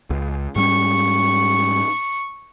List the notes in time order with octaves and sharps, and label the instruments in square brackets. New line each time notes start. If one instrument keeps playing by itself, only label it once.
[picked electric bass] C#2
[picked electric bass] G#2 G3 C#4 [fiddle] C#6